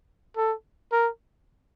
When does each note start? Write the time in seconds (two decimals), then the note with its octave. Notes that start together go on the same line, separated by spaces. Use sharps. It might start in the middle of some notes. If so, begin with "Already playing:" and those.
0.37 A4
0.92 A#4